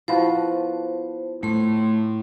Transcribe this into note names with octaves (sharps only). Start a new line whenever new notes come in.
F3 B3 E4 F#4 C5 F5 A5
A2 A3 C6